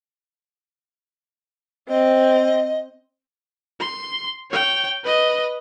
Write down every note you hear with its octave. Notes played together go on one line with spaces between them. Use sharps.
C4 D#5
C6
C#5 G5
B4 D#5